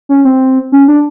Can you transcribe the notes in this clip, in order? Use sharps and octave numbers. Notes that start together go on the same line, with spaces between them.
C#4
C4
C#4
D4